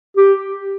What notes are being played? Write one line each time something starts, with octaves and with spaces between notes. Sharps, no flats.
G4